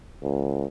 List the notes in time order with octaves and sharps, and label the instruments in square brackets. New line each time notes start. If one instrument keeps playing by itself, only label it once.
[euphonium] C#2